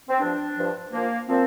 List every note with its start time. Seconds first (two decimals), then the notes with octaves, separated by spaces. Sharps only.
0.09 C4
0.19 G2 F3 D4
0.56 G2 F3
0.92 A#2 F3 A#3
1.29 A#2 F3 C4